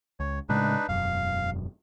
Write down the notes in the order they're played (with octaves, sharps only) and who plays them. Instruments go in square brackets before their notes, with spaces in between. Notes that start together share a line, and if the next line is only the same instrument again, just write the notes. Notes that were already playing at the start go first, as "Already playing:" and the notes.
[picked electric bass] C#2 [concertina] C#5
[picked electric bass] A2 C#3 G#3 [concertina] D4 D#4 B4
[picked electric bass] E1 F#2 [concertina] F5